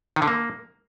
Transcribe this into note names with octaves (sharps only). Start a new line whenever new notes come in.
D#3
D3
A#3